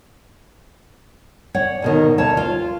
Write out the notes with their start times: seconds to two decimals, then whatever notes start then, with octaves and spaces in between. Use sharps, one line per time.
1.54 C#5 D5 F#5
1.82 D2 B2 D#3
2.18 D2 C#5 A5
2.37 F4